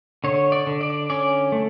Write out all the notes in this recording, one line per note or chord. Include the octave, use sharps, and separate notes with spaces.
D3 C#5
D5
D3
D5
C#4 D5
A3